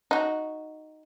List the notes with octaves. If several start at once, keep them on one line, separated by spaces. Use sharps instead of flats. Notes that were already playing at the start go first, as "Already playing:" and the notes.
D#4 F#4